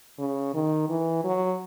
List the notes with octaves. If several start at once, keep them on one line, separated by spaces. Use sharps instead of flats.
C#3
D#3
E3
F#3